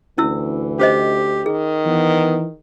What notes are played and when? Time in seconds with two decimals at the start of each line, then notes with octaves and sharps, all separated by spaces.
0.18 D2 E3 C#4 E4 E6
0.79 C#4 G4 C5 D#5
1.46 D#3 G#4
1.86 E3 B3